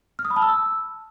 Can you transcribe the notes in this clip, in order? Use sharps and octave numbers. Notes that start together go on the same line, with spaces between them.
F6
D#6
B5
A5
E6